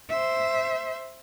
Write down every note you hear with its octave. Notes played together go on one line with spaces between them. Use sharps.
C5 E5